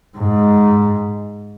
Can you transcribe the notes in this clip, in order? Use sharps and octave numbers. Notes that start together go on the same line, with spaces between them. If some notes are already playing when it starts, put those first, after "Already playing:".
G#2